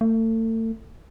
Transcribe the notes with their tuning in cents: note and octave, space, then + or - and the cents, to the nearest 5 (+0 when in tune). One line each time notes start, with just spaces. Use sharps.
A3 +35